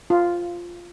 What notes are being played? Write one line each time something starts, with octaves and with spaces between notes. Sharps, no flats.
F4